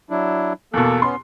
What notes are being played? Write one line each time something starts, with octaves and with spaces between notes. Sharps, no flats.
F#3 D4 E4
E2 B2 A#3 A4
B3 C#4 C6